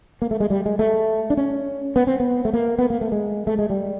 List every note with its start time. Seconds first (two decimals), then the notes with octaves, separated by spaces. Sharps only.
0.22 A#3
0.31 A3
0.40 G#3
0.50 G3
0.66 G#3
0.79 A3
1.30 D4
1.37 C#4
1.96 B3
2.07 C4
2.20 B3
2.45 A3
2.53 A#3
2.79 B3
2.90 A#3
3.01 A3
3.12 G#3
3.47 A3
3.59 G#3
3.70 G3